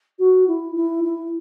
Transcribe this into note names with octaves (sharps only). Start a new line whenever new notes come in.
F#4
E4
E4
E4